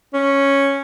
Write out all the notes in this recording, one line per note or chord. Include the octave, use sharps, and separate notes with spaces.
C#4